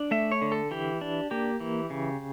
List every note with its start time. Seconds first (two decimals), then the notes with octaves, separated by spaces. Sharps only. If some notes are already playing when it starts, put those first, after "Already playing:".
Already playing: D4
0.11 A3 E5
0.32 C#5
0.42 D3
0.52 A4
0.71 E3 G4
1.01 D4
1.31 A#3 G4
1.60 E3
1.90 C#3